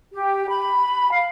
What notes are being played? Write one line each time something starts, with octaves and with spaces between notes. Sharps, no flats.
G4
B5
F5